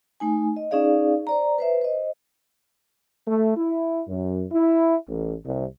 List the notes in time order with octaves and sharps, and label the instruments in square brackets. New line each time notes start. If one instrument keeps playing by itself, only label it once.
[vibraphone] A3 D#4 G#5
D#5
C#4 D#4 G#4 D5 F5
C5 D5 A#5
B4 C5 E5
C5 D#5
[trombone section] A3
E4
F#2
E4
A1
C2